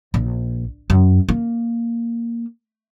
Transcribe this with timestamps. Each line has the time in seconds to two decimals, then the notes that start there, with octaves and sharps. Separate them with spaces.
0.14 A#1
0.90 F#2
1.29 A#3